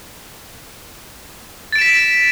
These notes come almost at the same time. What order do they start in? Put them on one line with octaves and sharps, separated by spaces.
A6 D7 E7 B6